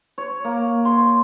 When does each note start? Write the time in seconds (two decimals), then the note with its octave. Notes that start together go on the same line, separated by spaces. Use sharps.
0.18 C#5
0.44 A#3
0.85 C6